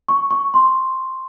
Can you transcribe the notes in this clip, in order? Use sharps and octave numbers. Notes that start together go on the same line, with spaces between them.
C#6
C#6
C6